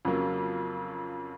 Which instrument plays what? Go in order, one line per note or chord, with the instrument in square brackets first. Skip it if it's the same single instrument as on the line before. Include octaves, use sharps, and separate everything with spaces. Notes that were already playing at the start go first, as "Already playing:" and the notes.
[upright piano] F2 C#3 F#3 A#3